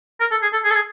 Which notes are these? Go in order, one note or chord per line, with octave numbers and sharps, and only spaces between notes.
A#4
A4
G#4
A4
G#4
A4
G#4